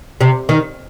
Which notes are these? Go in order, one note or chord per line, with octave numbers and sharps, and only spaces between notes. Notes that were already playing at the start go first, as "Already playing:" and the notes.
C3
D#3